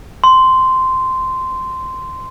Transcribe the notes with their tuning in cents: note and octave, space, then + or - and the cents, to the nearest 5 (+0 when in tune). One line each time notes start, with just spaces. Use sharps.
C6 -10